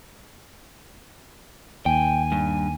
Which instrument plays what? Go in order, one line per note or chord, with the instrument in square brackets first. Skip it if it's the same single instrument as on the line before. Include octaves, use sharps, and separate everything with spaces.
[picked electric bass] D#2 [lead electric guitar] G5 [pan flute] G#5
[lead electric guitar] G2